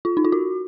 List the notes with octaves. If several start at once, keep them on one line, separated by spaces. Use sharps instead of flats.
F4
D#4
F4
F#4